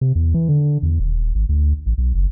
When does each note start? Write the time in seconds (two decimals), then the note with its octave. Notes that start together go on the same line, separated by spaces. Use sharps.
0.01 C3
0.15 E2
0.34 E3
0.49 D3
0.83 E2
0.99 D#1
1.35 G#1
1.49 D2
1.86 A1
1.98 B1
2.15 F#1